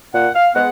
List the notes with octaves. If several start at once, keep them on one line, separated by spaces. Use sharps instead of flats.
A#2 F#5
F5
G#3 B3 F#5